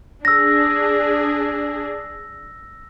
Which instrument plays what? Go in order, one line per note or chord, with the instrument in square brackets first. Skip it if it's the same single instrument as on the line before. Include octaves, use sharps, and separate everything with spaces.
[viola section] D4 G#4 [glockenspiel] E6 A#6